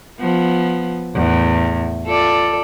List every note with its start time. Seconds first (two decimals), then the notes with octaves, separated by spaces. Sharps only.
0.20 F3 B3
1.15 E2 A2
2.05 F4 A4 D5